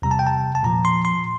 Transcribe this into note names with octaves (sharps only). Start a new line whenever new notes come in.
E2 C3 G3 A#5
A5
G5
A5
A5
A#2 F3 A#5
C6
C6